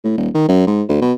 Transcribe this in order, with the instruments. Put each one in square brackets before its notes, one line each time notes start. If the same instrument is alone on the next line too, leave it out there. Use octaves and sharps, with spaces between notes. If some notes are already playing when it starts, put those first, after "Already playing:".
[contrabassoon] A2
D#1
D#3
F#2
G#2
D2
B2